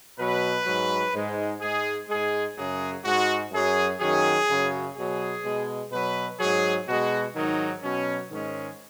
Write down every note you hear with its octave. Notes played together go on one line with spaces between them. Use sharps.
B2 F#3 B4
G#2 F#3
G#2 G#3
G#2 G#3 G#4
G#2 G#3 G#4
F#2 C#3 F#3 G#4
G#2 G#3 F#4
F#2 F#3 G#4
F#2 D#3 F#3 G#4
F#2 C#3 F#3
B2 F#3 G#4
B2 G#3
B2 F#3 B4
G#2 F#3 G#4
B2 G#3 F#4
G#2 D#3 F#3 D#4
B2 F#3 C#4
G#2 D#3 G#3 C#4